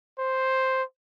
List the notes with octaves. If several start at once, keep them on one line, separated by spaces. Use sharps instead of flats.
C5